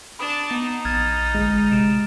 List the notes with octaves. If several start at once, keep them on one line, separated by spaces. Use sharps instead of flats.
D4 A5 B5 D#6 E7
B3 D#4
A#1 F6 G#6 A6
G1 G#3
C3 D7 E7